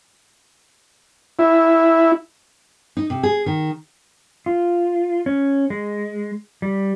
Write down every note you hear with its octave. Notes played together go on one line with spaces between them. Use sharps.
E4
D#4
C3
G#4
D#3
F4
C#4
G#3
G3